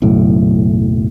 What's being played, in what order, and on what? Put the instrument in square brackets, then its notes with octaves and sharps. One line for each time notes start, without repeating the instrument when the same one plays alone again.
[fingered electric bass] F#1 B1 A2